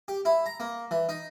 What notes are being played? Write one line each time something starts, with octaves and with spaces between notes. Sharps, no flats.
G4
E4
A#5
A#3
E3
D#4